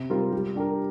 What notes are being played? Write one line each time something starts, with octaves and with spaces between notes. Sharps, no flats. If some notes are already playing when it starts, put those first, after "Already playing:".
Already playing: C3
G3 C4 F4 A#4
G3
D4 G4 A#4